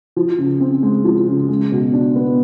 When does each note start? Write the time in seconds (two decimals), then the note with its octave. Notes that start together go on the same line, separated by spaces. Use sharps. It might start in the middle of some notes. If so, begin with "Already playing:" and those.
0.16 F3
0.38 C#3
0.60 C4
0.83 G#3
1.05 F3
1.27 C#3
1.49 G#3
1.72 B2
1.94 D4
2.16 B3